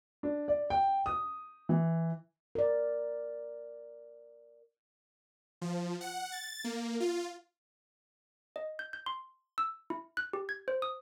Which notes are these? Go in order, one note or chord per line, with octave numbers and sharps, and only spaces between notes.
D4
D5
G5
D#6
E3
A#4 D5
F3
F#5
A6
A#3
F4
D#5
G6
G6
C6
E6
E4
F#6
G4
G#6
C5
D#6